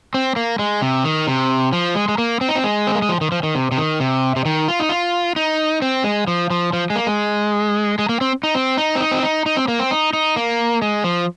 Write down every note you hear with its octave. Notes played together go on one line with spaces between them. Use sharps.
C4
A#3
G#3
C3
D#3
C3
F3
G#3
G#3
A#3
C4
D#4
C4
G#3
C4
A#3
G#3
F3
D#3
F3
D#3
C3
C3
D#3
C3
C3
D#3
F4
D#4
F4
D#4
C4
G#3
F3
F3
F3
G#3
A#3
G#3
G#3
A#3
C4
D#4
C4
D#4
C4
D#4
C4
D#4
D#4
C4
A#3
C4
D#4
D#4
A#3
G#3
F3